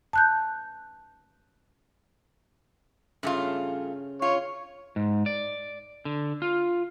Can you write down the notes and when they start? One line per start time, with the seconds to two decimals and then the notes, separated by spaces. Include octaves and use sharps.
0.13 A5 F#6 G6
3.23 G2 C#3 A3 F4
4.22 F4 C#5
4.96 G#2
5.26 D5
6.05 D3
6.42 F4